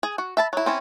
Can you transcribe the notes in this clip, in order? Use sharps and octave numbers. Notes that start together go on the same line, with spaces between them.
G#4
F#4
E5 A5 B5
F#3 E4
C4 C#4 E4